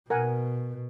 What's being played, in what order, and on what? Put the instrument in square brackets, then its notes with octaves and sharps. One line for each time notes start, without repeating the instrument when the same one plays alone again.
[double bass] B2 [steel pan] A#4 F#5 G#5